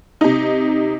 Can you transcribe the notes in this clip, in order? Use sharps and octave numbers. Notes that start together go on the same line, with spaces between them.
C3 D#4